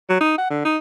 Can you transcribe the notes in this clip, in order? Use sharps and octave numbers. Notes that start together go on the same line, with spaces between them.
F#3
D#4
F#5
D3
D#4